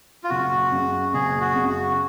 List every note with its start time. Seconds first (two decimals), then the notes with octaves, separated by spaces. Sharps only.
0.24 F4
0.30 F#1 F#4
0.71 F#2 C#3
1.13 F#1 G#4
1.41 F#4
1.55 F#2 C#3
1.69 F#4